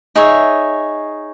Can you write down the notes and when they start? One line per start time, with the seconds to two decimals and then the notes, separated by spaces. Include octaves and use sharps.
0.16 D#4 G#4 C#5 E5